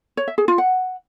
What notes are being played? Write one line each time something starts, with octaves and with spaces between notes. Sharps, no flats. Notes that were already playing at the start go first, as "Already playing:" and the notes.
C#5
E5
G#4
F4
F#5